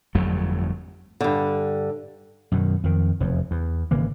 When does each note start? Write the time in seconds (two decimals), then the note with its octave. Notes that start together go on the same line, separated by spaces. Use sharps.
0.15 G1 F2 F#3 A3
1.21 G2 D3
2.52 F#2 B2 D#3
2.84 F2 D#3
3.20 F1 E2
3.51 E2
3.91 G#1 C#3 E3 A#3